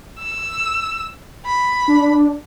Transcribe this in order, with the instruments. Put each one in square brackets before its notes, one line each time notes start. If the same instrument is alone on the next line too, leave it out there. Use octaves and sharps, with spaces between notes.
[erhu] E6
B5
[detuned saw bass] D4